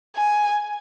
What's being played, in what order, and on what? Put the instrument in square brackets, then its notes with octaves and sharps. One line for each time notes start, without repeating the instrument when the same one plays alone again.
[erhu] G#5